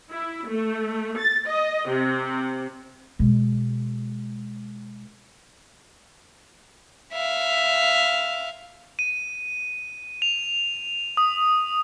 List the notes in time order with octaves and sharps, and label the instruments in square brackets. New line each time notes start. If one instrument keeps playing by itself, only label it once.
[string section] E4
A3
A6
D#5
C3
[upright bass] B2 G#3
[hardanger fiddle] E5 F5
[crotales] D#7
F7
D#6